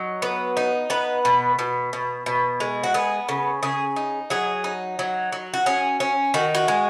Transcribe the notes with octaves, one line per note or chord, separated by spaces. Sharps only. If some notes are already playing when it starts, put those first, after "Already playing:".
Already playing: F#3 D#4
B3
D#4
B3 B4
B2
B2
B2
B2
G#3
F#4
B3 G#4
C#3
C#3 G#4
D#4
F#3 G#4
D#4
F#3
F#3
F#4
C#4 G#4
C#4
D#3 F#4
F#4
G#3